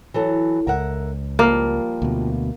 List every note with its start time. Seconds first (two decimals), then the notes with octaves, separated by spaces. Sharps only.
0.14 E3 F#3 A4
0.67 C#2 A#4 E5 F#5
1.39 F3 G3 A#3
2.02 D2 B2